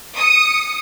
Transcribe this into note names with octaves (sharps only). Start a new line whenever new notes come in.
D#6 C#7